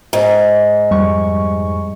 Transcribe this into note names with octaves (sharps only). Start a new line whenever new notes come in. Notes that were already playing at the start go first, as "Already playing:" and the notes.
G#2
F2 G3 C#6